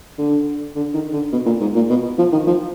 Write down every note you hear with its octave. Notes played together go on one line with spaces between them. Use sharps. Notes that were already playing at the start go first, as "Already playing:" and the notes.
D3
D3
D#3
D3
B2
A#2
G#2
A#2
B2
F3
D#3
F3